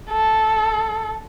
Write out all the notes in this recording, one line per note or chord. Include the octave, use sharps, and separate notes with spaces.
A4